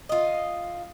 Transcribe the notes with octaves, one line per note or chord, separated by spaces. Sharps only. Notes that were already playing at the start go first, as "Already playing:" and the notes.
F4 D#5